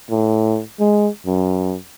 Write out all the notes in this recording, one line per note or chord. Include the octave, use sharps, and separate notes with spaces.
A2
G#3
F#2